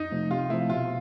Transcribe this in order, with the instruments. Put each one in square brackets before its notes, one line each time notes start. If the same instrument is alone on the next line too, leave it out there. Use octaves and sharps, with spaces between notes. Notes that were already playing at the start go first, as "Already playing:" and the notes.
Already playing: [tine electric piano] F2 [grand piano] D#4
[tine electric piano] C3 F3 A3
[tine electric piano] C3 [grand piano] F4
[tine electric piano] F3 A3 [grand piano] E4
[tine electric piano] B2 [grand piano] F4